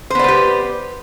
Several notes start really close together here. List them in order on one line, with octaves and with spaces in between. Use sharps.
C5 B3 D5 B4 G4